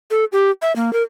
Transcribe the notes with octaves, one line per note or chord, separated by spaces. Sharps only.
A4
G4
E5
A#3
A#4